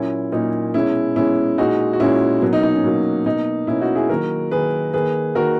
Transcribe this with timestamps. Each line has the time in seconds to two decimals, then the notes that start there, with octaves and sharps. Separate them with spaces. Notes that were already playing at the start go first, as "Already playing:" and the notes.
Already playing: A#2 F#3 A#3 C#4 E4
0.32 A#2 F#3 A#3 D#4
0.74 B2 G#3 C#4 E4
1.16 B2 G#3 C#4 E4
1.58 A#2 G#3 D#4 F#4
1.93 F#4
2.00 A#2 G#3 C#4 E4
2.42 B2 F#3 A#3
2.53 D#4
2.63 D#4
2.73 C#4
2.84 B2 F#3 A#3
3.26 B2 A#3 D#4
3.67 B2 A#3 C#4 E4
3.82 D#4 F#4
3.95 E4 G#4
4.09 D#3 F#3 A#3 F#4 A#4
4.51 D#3 F#3 A#3 G#4 B4
4.93 D#3 A#3 G#4 B4
5.35 D#3 A#3 F#4 A#4